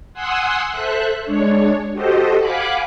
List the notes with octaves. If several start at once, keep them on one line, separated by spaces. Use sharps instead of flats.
F#5 G#5 C6 D#6 E6 F#6
A4 C5 E5 F#6
G#3 D4 C#5
F#4 G4 A4 C5 D#5
F5 F#5 G#5 B5 D6 F#6